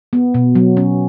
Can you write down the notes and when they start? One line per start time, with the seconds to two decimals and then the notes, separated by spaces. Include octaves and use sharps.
0.13 B3
0.34 B2
0.55 F#3
0.77 C#4